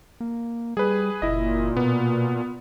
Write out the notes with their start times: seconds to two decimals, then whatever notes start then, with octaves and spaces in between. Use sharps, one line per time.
0.20 A#3
0.77 G3 G#4 B4
1.22 F#1 A#2 E4 D#5
1.77 B2 B3